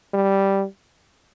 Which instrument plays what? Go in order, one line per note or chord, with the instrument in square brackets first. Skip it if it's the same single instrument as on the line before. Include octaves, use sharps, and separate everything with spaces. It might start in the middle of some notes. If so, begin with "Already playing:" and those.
[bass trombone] G3